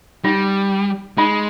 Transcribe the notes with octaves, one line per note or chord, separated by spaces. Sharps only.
G3 D#4
G#3 D#4